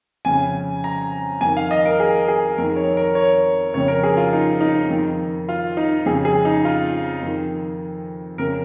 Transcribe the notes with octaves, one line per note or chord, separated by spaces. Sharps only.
F2 C#3 G#5
A#5
F2 D#3 G#5
F5
D#5
A#4
G#4
G#4
F2 D#3 A#4
C#5
A#4
C#5
F2 C#3 C#5
A#4
G#4
F4
D#4
D#4
F2 D#3
F4
D#4
F2 C#3 G#4
G#4
D#4
F4
F2 D#3
F2 C#3 A#4